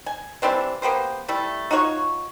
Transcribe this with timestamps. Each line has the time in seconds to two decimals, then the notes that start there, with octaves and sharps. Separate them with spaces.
0.06 G#5
0.42 E3 G3 C4 D4
0.82 A#3 B3 G4 C5
1.28 G3 A3 E4
1.71 D#4 F4 F#4 C#5